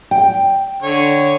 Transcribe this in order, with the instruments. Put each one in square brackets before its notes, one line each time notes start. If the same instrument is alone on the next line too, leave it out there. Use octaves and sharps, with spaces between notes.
[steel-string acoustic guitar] G5
[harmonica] D3 C#5